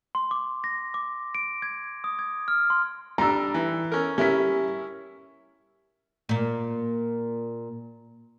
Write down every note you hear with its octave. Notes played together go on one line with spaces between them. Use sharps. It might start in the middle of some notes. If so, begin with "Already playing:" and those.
C6
D6
A#6
D6
D7
G#6
D#6
G#6
F6
C6
G3 D4 A#5 E6
E3
C#4 A#4
G3 C#4 E4 A#4 B6
A#2 A#3